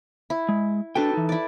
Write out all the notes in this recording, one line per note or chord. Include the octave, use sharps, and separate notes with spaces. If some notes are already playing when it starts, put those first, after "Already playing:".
E4
G#3
D4 F#4 A4 B4 G5
E3 D#4
E4 D5